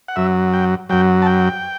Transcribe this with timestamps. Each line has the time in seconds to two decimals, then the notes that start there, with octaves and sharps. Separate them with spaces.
0.08 F#5
0.16 F#2 F#3 E5
0.53 G5
0.89 F#2 F#3 G5
1.22 A5
1.26 G5